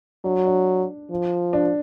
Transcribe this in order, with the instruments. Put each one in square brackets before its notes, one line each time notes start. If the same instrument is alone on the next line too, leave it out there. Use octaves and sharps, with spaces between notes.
[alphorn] F#3 [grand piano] D4
[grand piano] D4
[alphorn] F3
[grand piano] D4